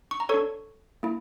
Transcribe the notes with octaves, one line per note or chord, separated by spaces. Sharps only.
C#6
A#5
D4 A4 C#5 C#6
A#3 E4